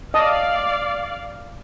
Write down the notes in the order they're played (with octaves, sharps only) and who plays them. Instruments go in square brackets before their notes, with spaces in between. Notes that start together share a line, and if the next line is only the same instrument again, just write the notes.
[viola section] D5 F5 [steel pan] D#5 A5 D#6